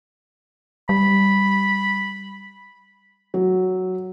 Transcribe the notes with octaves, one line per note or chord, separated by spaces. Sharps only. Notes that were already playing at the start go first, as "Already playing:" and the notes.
G3 B5
F#3